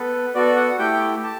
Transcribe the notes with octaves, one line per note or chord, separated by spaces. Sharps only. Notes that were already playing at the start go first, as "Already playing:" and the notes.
Already playing: B3 A4 B4
B3 F#4 A4 D5
F#5
A3 E4 G4 G5
G4 A5